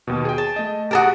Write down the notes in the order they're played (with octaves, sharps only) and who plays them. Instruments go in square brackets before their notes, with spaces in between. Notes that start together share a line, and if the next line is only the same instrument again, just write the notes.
[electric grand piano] D#2 B2
G#4 G5
[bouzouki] A5
[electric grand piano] A3 D#5
[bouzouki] F#4 A4 A#4 [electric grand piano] G4 D#6